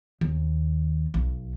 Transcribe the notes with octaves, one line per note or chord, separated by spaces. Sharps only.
D#2
B1